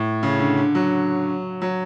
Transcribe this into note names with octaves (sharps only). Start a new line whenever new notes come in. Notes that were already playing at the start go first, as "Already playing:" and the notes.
Already playing: A2
C#3
D3
D3
F#3
F#3